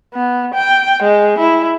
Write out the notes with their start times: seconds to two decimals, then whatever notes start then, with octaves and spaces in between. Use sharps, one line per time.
0.14 B3
0.54 G5
1.03 G#3
1.39 E4